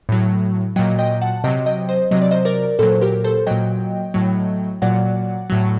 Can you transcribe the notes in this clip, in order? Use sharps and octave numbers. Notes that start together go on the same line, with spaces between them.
A2 F#3
A#2 F#3 D#5 G5
D#5 G5
F#5 A5
C3 F#3 D#5 G5
D#5 G5
C5 D#5
C3 F#3 D#5
D5
C5 D#5
A#4 D5
A#2 F#3 A4 C5
G4 A#4
A4 C5
A#2 F#3 D#5 G5
A2 F#3
A#2 F#3 D5 F#5
A2 F#3